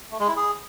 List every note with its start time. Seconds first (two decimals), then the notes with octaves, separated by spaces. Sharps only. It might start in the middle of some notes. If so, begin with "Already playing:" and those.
0.11 A3
0.20 G#3
0.28 E4
0.36 G#4